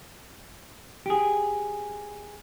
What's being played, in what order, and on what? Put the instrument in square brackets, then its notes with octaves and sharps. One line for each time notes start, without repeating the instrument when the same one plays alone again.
[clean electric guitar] G4 G#4